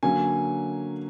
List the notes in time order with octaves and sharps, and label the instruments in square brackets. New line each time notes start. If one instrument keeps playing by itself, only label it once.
[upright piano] D3 F#3 A#3 C#4 G#5